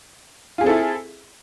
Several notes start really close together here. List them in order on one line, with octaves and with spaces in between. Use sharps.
F4 G#4 C4 A4 E4